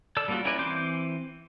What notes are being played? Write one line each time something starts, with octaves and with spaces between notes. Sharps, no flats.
A4 D5 E6
G3 A#3 C#4 F4 F#4
C#4 E4 A#4 B4 D5
E3 C4 C6 D6 G6